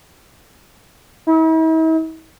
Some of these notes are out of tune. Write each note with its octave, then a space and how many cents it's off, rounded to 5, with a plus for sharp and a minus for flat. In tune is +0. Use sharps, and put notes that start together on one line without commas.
E4 -45